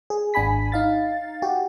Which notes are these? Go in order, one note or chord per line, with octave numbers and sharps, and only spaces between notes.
G#4
G#1 D4 G#5 B5 B6
D#4 F5 A6
F#4 G4